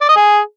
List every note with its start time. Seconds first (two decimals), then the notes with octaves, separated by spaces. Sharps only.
0.01 D5
0.09 D#5
0.16 G#4